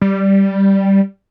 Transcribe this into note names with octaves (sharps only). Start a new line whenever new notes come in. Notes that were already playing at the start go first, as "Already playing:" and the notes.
G3